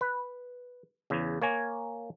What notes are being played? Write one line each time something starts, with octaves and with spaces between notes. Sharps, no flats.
B4
E2 C#3
A#3 C#5 G#5 A#5